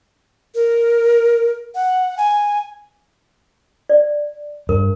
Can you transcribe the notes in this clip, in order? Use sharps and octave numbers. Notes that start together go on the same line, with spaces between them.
A#4
F#5
G#5
D5
G2 A#4